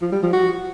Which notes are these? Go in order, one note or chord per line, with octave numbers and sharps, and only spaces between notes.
F3
G3
F3
F#4